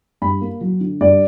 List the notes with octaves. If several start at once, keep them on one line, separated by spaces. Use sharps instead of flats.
G2 B5
A#3
F#3
D3
G2 D5